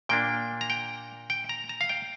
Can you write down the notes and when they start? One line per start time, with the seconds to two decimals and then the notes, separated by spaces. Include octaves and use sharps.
0.09 A#2 A#3 D4 G5
0.61 A#5
0.70 G5
1.30 G5
1.49 A#5
1.69 A#5
1.81 F5
1.89 G5